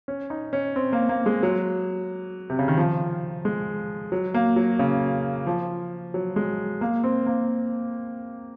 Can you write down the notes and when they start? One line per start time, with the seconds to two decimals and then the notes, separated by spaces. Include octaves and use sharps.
0.08 C#4
0.30 D#4
0.53 C#4
0.76 C4
0.93 A#3
1.09 A#3
1.26 G#3
1.43 F#3
2.50 C3
2.59 C#3
2.68 D#3
2.77 F3
3.45 G#3
4.12 F#3
4.34 A#3
4.56 F#3
4.79 C#3
5.47 F3
6.14 F#3
6.36 G#3
6.81 A#3
7.04 C4
7.26 A#3